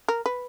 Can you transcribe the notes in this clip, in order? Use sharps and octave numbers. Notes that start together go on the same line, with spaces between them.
A#4
B4